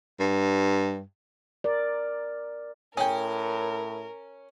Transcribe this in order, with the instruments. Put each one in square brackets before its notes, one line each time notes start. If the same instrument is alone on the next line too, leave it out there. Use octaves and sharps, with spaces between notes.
[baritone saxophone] G2
[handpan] A#4 D5
[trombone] A2 [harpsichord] C#4 [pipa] G#4 G5 [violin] A#4